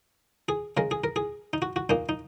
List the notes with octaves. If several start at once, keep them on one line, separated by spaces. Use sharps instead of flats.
G#4
C#3 G#3 A#4
G#4
A#4
G#4
D#4
F#4
F#4
A#2 A#3 D#4
D#4